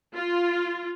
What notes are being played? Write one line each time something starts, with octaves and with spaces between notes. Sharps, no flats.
F4